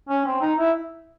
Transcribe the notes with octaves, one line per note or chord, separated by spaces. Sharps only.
C#4
C4
D#4
E4